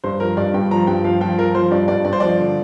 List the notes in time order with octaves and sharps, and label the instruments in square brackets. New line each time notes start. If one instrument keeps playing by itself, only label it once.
[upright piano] G2 [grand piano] C5
[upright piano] F3 [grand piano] A#4
[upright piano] G2 [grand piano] D5
[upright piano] G2 [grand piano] G5
[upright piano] F3 [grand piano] A#5
[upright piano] G2 [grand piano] G5
[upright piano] F3 [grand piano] F5
[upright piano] F3 [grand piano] G5
[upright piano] F3 [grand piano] A#4
[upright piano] F3 [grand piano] C5
[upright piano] G2 [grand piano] D5
[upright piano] G2 [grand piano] D5
[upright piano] G2 [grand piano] D5
[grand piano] C5
[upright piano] F3 [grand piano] D5
[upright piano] D3